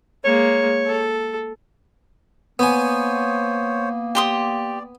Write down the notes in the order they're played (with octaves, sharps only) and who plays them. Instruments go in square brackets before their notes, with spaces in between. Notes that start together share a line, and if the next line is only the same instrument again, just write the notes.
[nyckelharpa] G#3 A#3 [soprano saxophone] C#5
[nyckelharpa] A4
[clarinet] A#3 [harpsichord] B3 G#5 [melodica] C5 C#5
[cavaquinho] G4 C6 D#6 [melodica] D5